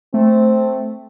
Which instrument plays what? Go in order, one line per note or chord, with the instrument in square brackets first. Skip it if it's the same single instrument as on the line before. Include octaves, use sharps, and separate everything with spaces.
[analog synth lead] A3 [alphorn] C4